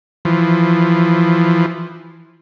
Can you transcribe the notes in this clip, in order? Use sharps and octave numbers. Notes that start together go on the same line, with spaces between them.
E3 F3